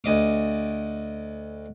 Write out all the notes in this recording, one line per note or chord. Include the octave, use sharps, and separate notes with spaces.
D2 D#5 D6